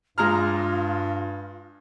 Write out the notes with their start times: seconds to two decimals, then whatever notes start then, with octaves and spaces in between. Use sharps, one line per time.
0.18 G2 G#3 F4 A#5 F6